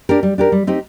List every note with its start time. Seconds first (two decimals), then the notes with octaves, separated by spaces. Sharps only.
0.09 D4 G4 A#4
0.23 G3
0.38 D4 G4 A#4
0.52 G3
0.67 C4 D#4 G4